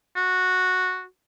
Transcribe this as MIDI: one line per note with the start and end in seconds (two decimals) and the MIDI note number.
0.16 1.04 66